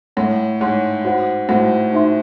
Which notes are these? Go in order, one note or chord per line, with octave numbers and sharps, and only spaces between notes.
A2 C#5 F#5 C6
G#2 C#5 F#5 C6
F#4 C5 F#5
A2 F#4 C5 F#5
D#4 F#4 C5 E5 C6